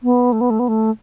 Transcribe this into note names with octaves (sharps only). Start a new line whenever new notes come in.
B3
A3
B3
A3
B3
A3